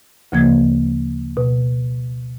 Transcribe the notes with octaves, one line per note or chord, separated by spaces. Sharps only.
D2 C#3 F3 A#3 G#6
B2